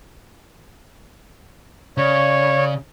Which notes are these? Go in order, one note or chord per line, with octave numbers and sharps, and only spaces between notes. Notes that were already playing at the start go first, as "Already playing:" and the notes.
C#3 C#5 D5